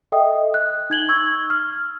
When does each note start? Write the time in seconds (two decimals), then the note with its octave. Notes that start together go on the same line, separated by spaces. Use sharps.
0.12 A4 D#5 E5 G5 D#6
0.54 F#6
0.90 D#4 G#6 F#7 G7
1.09 C#6 E6 G#6
1.50 F6